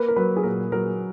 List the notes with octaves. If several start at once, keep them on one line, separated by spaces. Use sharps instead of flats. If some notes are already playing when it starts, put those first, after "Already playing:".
Already playing: A#3 B4
A#4
F#3 B4
G#4
A#2 A#4
F#3 A#4